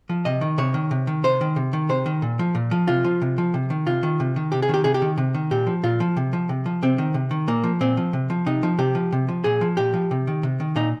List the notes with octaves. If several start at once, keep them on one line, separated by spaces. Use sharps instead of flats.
F3
C3 D#5
D#3
C3 C#5
D#3
C3
D#3
C3 C5
D#3
C3
D#3
C3 C5
D#3
A#2
F3
A#2
F3
C3 F4
F3
C3
F3
C3
D#3
C3 F4
D#3
C3
D#3
C3 G4
G#4
D#3 G4
C3 G#4
G4
D#3
C3
D#3
A#2 G4
F3
A#2 F4
F3
C3
F3
C3
F3
C3 C4
D#3
C3
D#3
A#2 A#3
F3
A#2 C4
F3
C3
F3
C3 D#4
F3
C3 G4
F3
C3
F3
A#2 G#4
F3
A#2 G4
F3
C3
D#3
C3
D#3
A#2 D#4